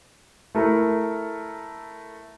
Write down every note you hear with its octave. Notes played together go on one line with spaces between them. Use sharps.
A3 E4 A4 A#4